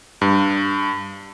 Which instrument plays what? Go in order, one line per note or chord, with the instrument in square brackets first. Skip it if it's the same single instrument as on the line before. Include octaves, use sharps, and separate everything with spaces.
[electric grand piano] G2